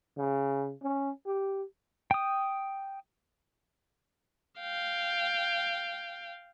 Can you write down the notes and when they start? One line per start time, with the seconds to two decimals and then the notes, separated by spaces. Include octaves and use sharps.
0.17 C#3
0.83 C#4
1.26 G4
2.11 G5 D#6
4.60 F5 G5